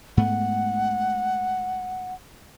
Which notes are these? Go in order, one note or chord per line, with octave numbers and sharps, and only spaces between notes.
G#2 A3 B3 F#5